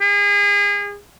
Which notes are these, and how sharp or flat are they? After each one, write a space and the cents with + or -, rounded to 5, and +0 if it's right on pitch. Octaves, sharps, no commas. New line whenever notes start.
G#4 -35